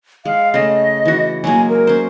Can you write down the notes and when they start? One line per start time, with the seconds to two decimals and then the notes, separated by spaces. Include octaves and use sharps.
0.25 G#3 F5
0.54 C#3 A3 D#5
1.05 E3 F#4
1.44 F#3 G#3 A#3 G#5
1.69 A#4
1.87 C#4 C5